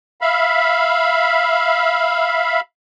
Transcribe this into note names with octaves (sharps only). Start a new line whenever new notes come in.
E5 F5 B5